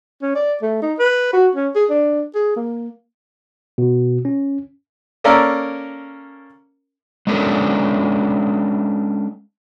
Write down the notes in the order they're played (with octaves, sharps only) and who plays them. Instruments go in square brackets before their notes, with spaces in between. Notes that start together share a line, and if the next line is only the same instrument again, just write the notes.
[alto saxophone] C#4
D5
A3
D#4
B4
F#4
C#4
G#4
D4
G#4
A#3
[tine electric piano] B2
C#4
[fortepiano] A#3 C#4 A4 A#4 D5
[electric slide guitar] G#3 B3 C#4 D4 A4 A#4